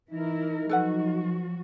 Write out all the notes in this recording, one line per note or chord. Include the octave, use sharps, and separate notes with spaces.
E3 D#4 E4 A#4
F3 F#3 F#4 A4 B4 F#5